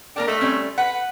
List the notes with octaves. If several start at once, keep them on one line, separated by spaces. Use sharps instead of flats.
A#3 D4 A#4 G5
A3 D#5 E5
G3 C4 C#4
B4 F#5